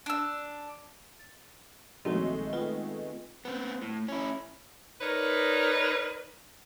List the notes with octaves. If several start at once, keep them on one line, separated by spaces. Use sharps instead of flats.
D4 E6
A6
A#1 D#3 F#3 G#3 A3 C4 D#4
B3 F4 G5
B3 C4
A2
C#4 E4
D#4 A#4 B4 C#5 D5